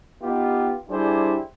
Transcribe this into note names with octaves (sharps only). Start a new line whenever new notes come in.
B3 D#4 F4 G4
G3 D4 E4 G4 G#4 C5